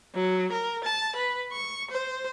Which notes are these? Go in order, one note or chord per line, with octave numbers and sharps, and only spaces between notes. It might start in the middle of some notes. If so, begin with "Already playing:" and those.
F#3
A#4
A5
B4
C#6
C5